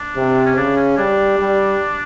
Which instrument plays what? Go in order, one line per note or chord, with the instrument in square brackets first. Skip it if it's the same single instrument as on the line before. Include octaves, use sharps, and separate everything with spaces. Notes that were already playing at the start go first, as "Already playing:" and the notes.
Already playing: [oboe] D4
[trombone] C3
[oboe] C#4
[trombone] C#3 [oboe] D4
[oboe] C#4
[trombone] G3 [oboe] D4
[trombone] G3